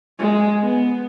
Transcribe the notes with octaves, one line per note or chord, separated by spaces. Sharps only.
G#3
B3